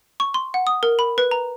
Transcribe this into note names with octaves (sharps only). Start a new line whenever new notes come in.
C#6
C6
F#5
D#6
A#4
B5
B4
A#5